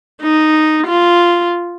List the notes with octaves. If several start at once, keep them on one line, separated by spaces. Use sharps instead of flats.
D#4
F4